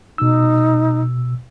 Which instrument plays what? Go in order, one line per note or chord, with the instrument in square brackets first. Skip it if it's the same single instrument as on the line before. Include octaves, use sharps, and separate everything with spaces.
[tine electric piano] B2 E6 [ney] D#4